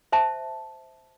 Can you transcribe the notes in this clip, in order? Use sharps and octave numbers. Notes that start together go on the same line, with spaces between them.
C5 E5 A5